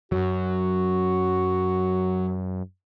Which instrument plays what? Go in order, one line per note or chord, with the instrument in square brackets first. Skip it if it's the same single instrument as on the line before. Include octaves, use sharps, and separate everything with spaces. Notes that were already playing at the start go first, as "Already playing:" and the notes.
[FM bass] F#2 [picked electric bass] F#3 [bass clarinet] F#4